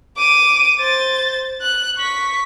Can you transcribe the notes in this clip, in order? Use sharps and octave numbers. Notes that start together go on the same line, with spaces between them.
D6 D#7
C5 A6
F#6
C#6 B6